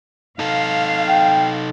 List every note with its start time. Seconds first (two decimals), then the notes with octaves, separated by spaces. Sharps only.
0.39 D#4 A4 F5
1.08 G5